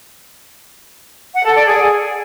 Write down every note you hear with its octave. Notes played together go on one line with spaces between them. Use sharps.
F#5
A4
D5
G#4